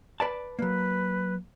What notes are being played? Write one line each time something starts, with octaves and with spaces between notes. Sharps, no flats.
B4 D5 A5
F#3 A#3 B4